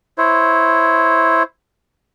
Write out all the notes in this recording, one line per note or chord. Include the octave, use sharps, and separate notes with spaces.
E4 C5 C#5